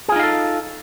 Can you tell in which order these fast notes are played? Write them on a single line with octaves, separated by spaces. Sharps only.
G#4 F4 D#4 F5 A4